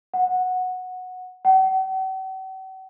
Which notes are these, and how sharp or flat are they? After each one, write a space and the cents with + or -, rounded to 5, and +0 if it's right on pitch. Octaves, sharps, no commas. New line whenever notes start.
F#5 -10
F#5 +45